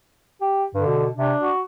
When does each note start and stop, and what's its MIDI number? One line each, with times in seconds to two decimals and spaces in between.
0.41 0.64 67
0.74 0.83 43
0.74 1.05 50
0.87 1.10 47
1.16 1.32 48
1.16 1.51 62
1.41 1.61 66